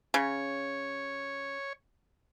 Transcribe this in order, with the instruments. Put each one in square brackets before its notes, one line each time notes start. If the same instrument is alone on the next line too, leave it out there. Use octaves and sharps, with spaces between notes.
[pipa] C#3 [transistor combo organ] C#5